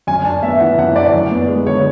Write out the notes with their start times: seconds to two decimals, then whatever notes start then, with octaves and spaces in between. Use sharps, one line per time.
0.07 F#2 G#5
0.25 D4 A5
0.43 B3 E5
0.60 E3 F#5
0.78 F#2 F#5
0.96 D4 D5
1.13 F#2
1.31 B3
1.49 G#3
1.66 D3 C#5